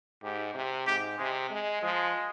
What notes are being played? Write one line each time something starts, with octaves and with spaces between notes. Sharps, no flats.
G#2 G4
C3
G#2 G4
C3 G#3
G#3
F3 G#3